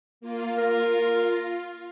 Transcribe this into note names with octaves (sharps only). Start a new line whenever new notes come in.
A#3 F4
F4 A#4